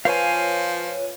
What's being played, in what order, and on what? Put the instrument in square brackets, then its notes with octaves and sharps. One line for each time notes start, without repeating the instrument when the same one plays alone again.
[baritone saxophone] F3 [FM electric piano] F4 B4 C#5 [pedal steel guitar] F5 G#5